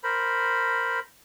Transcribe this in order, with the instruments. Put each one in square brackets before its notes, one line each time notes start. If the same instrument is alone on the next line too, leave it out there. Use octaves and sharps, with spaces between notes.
[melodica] A#4 C5 B5